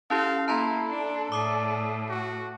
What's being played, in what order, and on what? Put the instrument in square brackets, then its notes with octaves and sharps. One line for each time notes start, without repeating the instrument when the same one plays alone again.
[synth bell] C#4 E4 G4 [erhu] A4 [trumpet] F5
[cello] A#3 [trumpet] E4 [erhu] A4 [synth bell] A5 A#5 C6
[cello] D4
[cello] A2 [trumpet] D5 [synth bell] D6 D#6
[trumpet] F#4